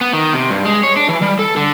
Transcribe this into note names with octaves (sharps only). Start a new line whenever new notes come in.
B3
D#3
C3
G2
G#3
C#5
D4
E3
G3
A4
D3